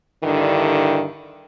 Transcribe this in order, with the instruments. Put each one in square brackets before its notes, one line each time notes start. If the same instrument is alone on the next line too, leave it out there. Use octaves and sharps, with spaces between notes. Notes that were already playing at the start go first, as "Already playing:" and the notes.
[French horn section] G2 D3 D#3 E4